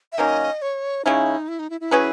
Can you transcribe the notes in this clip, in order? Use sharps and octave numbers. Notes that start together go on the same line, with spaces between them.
E5
D#3 F#3 A#3 C#4 D#5
C#5
C#3 G#3 C#4 D#4 E4
E4
D#4
E4
E4
F#3 C#4 G#4 B4